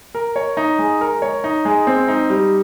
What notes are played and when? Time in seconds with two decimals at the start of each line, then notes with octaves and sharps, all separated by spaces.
0.15 A#4
0.36 C#5
0.57 D#4
0.79 G#3
1.01 A#4
1.22 C#5
1.44 D#4
1.65 G#3
1.87 C4
2.08 D#4
2.30 G3